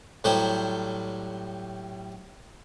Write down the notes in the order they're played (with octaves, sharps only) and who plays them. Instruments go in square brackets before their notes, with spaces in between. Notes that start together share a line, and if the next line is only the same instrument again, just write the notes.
[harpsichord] A2 F#3 G3 C5